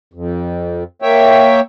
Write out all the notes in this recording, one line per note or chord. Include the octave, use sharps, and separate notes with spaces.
F2
A#3 C#5 E5 G5